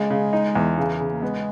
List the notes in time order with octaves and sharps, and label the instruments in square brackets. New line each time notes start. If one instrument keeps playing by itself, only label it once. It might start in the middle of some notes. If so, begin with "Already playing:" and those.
Already playing: [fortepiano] C#3 [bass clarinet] G#3
[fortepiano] C#3
D#4
E2
C#3
C#3
[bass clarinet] A#3
[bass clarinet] G#3 [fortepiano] B3